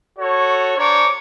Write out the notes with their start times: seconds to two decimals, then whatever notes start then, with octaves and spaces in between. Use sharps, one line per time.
0.19 F#4 A4 C#5
0.77 D4 C5 C#5 A#5 D6